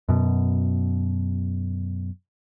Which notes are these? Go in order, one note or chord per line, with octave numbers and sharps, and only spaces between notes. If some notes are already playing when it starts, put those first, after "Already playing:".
F#2 B2